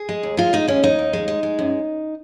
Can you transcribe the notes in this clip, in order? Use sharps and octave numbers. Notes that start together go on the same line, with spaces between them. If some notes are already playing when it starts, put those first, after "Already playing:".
Already playing: G#4
G#3
D#2
G#3 F4
G#3 D#4
D#2 C#4
D#2 D#4
D#2
G#3
G#3
G#3
F#2